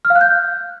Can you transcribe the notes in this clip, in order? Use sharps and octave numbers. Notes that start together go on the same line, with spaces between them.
F6
F5
F#6
G6